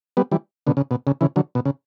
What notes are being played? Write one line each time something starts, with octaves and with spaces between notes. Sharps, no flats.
G3 B3
E3 G3
B2 D3
C#3
B2
C#3
C#3 E3
D3 F#3
B2
C#3